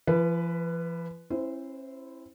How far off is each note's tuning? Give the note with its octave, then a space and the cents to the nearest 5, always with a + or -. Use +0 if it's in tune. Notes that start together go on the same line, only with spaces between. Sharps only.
F3 -45 B4 +0
C#4 -45 E4 +0 C5 -15